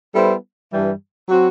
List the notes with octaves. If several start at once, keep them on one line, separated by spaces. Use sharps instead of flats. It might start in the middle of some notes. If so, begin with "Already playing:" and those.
G3 B3 E4 A4 C5
G2 E3 G3
F#3 C4 F#4